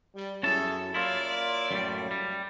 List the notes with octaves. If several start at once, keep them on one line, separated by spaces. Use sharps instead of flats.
G3
F#2 C#4 E4 G#4 A4 A5
A#3 E4 F4 C#5 D5
F#2 A2 G3
G3